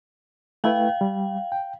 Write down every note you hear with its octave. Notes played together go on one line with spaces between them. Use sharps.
A3 E4 B4 F5 G5
G3
G5